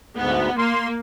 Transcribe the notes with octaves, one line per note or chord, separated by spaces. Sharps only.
D2 G#2 B3
A#3 C6